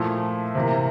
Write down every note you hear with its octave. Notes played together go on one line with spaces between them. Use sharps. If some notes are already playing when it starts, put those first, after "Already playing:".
Already playing: A#2 F3 A3 E4
C3 E3 A#3